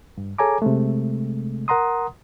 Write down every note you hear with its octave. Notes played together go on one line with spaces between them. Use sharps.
G2
G#4 A4 C#5 G#5 A#5 D6
C3 G#3 A3
A#4 F#5 A#5 C6 D#6